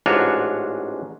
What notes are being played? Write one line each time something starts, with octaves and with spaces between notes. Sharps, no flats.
A1 G#2 D4 F4 F#4 C#5